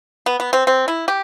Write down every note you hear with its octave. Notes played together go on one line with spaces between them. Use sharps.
B3
B3
C4
C4
E4
G4